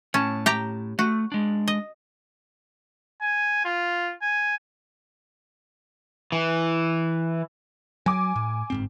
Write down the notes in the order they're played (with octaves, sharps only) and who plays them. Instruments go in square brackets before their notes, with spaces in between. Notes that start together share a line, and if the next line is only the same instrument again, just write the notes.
[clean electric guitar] A2 A5 [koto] C#4
[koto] G4 G5 A#5
[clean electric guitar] A3 [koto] F#4
[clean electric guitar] G#3 D4
[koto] D#5
[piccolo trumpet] G#5
F4
G#5
[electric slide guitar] E3
[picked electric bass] F#3 [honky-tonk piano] G#5 D6
[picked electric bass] A2
G1 G#2 C4